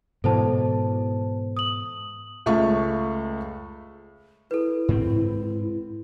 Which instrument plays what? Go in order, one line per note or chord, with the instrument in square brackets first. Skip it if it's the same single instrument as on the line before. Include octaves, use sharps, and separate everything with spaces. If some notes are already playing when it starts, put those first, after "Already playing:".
[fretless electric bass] G#2 B2 E3 [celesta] A4 C5 A5
[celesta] D#6 F#7
[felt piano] C#2 A3 F5 C#6
[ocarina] E4 [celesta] A4 B4
[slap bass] G#2 C4